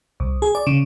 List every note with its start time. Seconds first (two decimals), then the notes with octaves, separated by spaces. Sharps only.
0.20 C2
0.42 G#4
0.55 D5
0.67 C#3